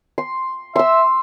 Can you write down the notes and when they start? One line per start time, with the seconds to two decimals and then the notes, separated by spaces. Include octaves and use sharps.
0.18 C6
0.76 E5 C6 E6